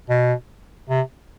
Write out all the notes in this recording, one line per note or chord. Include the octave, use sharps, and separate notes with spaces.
B2
C3